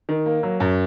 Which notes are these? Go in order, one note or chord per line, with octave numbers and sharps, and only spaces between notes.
D#3
A#3
F#3
F#2